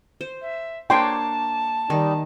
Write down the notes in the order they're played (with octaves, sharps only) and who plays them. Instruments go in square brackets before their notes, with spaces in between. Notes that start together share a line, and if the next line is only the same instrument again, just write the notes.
[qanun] C5
[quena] E5
[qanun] A#3 D4 C#5 [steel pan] G5 C6 [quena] A5
[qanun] D#3 [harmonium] G3 D#4